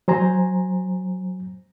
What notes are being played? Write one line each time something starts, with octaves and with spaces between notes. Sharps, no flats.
F#3 C5 G#5 A#5